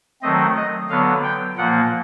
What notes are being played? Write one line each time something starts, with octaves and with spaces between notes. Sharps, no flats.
D#3 F#3 A3 C4 D#5
D#5
D3 F#3 B3 F5
G5
A#2 F3 A#3 F#5